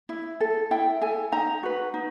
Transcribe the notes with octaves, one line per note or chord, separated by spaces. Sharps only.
E4
A4
E4 G5
A4 G#5
D#4 A#5
F#4 B4
D#4